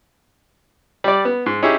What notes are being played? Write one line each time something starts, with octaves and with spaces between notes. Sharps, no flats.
G3 D5
B3
G#2
C#4 D#4 E4 G4 G#4